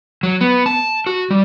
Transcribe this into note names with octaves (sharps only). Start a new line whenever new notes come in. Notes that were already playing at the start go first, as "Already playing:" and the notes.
F#3
B3
A5
F#4
G3